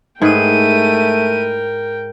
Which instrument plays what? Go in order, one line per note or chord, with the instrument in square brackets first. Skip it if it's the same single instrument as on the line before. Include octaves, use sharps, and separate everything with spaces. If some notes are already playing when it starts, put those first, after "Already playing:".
[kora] G#2 G#4 B4 [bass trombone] A3 [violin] E4 D#7 [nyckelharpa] A#4 G5